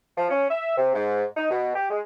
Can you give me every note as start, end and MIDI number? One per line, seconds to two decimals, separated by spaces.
0.17 0.30 53
0.30 0.46 61
0.50 0.76 76
0.77 0.91 48
0.94 1.24 44
1.37 1.47 63
1.50 1.74 47
1.76 1.90 67
1.90 2.00 56